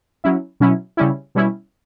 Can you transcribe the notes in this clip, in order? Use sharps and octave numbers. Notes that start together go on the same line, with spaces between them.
F#3 C#4 E4
B2 F#3 C#4 E4
C#3 G3 C#4 E4
B2 G3 C#4 E4